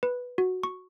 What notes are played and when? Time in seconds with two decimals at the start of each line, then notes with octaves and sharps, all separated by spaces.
0.03 B4
0.38 F#4
0.63 C#6